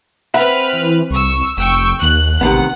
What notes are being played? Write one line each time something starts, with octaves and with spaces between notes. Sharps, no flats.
C4 B4 E5 F#5 B5 F6
E3
C2 C#6 E6
F1 G5 C#6 E6
D#2 F#6
A1 C3 D#3 B3 F#5